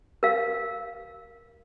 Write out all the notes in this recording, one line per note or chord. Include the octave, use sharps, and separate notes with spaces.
A#4 F5